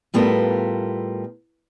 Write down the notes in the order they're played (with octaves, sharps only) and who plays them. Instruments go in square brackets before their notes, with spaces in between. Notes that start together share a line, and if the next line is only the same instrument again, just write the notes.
[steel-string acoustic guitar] A2 G3 B3 F4 A4 A#4